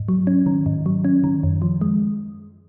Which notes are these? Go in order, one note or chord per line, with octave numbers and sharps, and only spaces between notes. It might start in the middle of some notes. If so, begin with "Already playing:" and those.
Already playing: G#2
F#3
C#4
D#3
G#2
F#3
C#4
D#3
F#2
F3
G#3